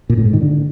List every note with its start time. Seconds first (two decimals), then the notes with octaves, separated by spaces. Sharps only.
0.09 A#2
0.17 A2
0.25 G#2
0.33 D#3
0.41 D3